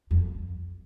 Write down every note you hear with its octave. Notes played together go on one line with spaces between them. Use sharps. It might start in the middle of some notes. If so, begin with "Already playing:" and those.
F2